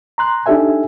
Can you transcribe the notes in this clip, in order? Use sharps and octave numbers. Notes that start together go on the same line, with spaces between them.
A#5 C6 F#6
D4 D#4 G4 A4 E5 G#5